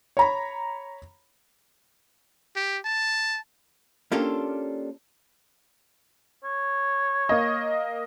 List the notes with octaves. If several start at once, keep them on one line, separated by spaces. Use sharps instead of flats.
C#5 A#5 B5
G4
A5
A#3 C#4 D4 F4 G4 A4
C#5
A#3 D#5